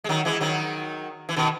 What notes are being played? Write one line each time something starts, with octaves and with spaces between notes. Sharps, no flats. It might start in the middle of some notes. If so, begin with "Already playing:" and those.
G#3
D#3 F#3
E3 G#3
D#3 F#3
E3
B2 D#3